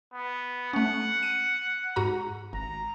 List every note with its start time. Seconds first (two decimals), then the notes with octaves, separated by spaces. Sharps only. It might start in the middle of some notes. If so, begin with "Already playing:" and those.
0.12 B3
0.73 A3 C#4 F#5
1.23 D#7
1.96 G#2 F#4 A#5
2.53 G#1 A#5